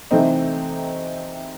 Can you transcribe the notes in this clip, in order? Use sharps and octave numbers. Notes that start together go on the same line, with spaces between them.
C3 E3 A3 C4 D#4